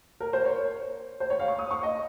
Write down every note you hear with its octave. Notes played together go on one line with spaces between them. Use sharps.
A#4
C5
C#5
C5
C#5
F5
C#6
D#6
C#6
D#5